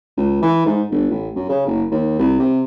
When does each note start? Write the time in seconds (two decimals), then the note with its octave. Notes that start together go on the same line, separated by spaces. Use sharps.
0.17 C#2
0.42 E3
0.66 G#2
0.91 G1
1.10 A1
1.35 F#2
1.49 C#3
1.67 F#1
1.91 D#2
2.19 C2
2.40 C3